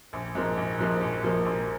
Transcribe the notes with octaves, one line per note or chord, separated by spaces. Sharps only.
A#1
G#2 F3 A#3
A#1
G#2 F3 A#3
A#1
G#2 F3 A#3
A#1